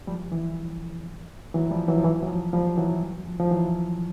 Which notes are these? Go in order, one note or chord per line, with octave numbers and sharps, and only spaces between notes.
F3 G3
E3
E3 F#3
F3 G3
E3 F#3
F3
E3
F#3
F3
F3 G3
E3 F#3
F3
F3
E3 F#3